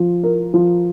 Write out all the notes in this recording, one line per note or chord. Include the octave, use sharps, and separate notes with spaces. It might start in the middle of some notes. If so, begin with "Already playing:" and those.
Already playing: F3
A#4
F3